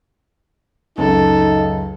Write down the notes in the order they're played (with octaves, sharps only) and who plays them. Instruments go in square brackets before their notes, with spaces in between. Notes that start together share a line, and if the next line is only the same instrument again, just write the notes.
[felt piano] C#2 F#2 A5 [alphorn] D#4 [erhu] A4